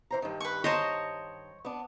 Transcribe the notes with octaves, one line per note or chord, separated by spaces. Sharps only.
E3 C5 A#5
G2 D#3
B4 C#6
C5 C#5 D#5 A5 A#5
B3 D4